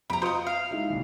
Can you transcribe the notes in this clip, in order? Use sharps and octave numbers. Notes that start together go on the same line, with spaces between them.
F2 A#5 B5 D7
F4 C5 D#5 D#6 C#7
F5
G#3 D#4 E4
D#1 C2